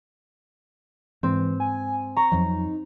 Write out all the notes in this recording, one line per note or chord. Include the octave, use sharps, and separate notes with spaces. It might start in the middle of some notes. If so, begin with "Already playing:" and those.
G#2 E3 C4
G#5
A#5 C#6
F2 F3 F#3 D#4